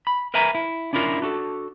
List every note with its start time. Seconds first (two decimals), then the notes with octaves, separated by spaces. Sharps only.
0.07 B5
0.34 A#4 B4 E5 G#5 A#5
0.55 E4
0.93 C#4 D4 E4 F4 A#4
1.22 D4 F#4 A4